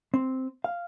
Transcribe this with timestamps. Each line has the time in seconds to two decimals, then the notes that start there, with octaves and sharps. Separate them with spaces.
0.14 C4
0.64 F5